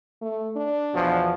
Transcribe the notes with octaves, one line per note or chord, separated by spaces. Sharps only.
A3
D4
E2 B2 F3